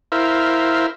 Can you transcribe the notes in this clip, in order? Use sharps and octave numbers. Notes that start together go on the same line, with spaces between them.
E4 A#4 C5 E5 F5